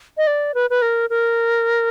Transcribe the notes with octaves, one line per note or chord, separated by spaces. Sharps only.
D#5
D5
B4
B4
A#4
A#4